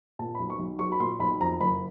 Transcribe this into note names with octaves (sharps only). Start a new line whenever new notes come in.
A#2 A5
B5
B1
C#6
B1
F#3 C#6
B5
A#2 C6
B1 B5
F2 A#5
F#1 B5